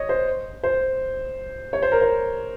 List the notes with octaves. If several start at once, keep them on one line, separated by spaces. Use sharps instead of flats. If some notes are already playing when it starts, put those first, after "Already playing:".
Already playing: C#5 D#5
C5
C5
C#5
C5
A#4
C5